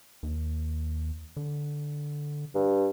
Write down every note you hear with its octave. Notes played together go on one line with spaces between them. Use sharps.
D#2
D3
G2